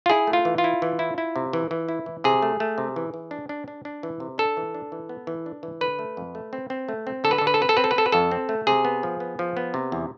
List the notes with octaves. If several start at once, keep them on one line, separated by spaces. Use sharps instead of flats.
F4
E4 G#4
A3
F4
E3
F4
E4
E3
E4
E4
C3
E3
E3
E4
E3
C3 G#4
A3
A3
C3
E3
E3
D4
D4
D4
D4
E3
C3
D4 A4
E3
D4
E3
B3
E3
D4
E3
D3 B4
A3
F2
A3
C4
C4
A3
C4
D3 A4
B4
A4
D3
B4
A4
C4 B4
A4
C4 B4
A4
B4
C4 A4
B4
F2 A4
C4
A3
C3 G#4
B3
F3
B3
F3
B3
C3
E2